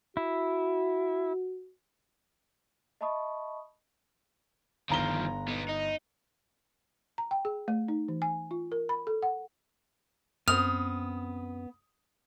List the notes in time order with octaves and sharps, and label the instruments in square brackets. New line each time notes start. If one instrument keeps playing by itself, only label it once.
[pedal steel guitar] E4 [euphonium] F#4
[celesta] D#5 E5 A5 B5 C#6 D#6
[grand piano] G1 A#5 G7 [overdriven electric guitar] D#3 F3
[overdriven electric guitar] B3 D#4
D#4
[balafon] A#5
G5
G#4
A3
D#4
E3
G#5
F4
A#4
B5
A4
F#5
[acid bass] F#2 [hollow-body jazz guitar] B3 C4 [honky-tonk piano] D#6 [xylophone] F6 F7